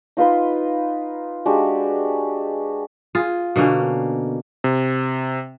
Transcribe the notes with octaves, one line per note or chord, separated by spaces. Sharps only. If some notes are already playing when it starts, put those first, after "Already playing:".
D#4 F4 B4 C6
G#3 D4 F#4 G4
F4 G#4
B2 D3 A#3 C#4
C3